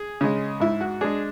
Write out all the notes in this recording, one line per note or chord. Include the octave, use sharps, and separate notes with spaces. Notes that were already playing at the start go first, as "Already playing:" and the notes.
Already playing: G#4
C#3 G#3
G#2 E4
F#4
G#3 D4 G#4